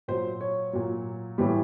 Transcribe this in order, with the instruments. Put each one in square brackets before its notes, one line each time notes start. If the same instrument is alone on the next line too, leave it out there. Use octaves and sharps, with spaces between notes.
[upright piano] A#2 F#3 C5
C#5
A#2 F#3
A2 E3 G3